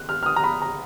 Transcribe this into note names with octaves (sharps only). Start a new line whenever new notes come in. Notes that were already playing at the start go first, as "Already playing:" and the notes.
Already playing: F#6
F6
F6
D#6
A#5
B5
A#5